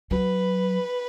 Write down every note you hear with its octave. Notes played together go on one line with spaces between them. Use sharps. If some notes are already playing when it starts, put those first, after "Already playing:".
F#3 B4